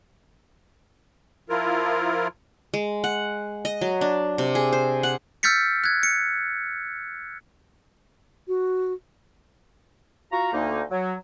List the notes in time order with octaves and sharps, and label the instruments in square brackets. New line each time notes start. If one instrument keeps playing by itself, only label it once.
[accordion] F3 E4 F4 A#4
[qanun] G#3
F#5
D#5
F#3
D4
C3
G#4
C5
F#5
[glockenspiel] E6 F6 G6 A6 B6 C#7
F#6 G#6
C#7
[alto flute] F#4
[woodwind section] F4 F#4 A#5
D2 A#3 D#4
F#3